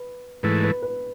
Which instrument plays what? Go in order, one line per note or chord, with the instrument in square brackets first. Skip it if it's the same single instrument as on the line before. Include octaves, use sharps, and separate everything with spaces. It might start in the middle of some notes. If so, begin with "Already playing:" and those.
Already playing: [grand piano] B4
[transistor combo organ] G#2 E3 A3 [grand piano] B4
[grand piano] B4
B4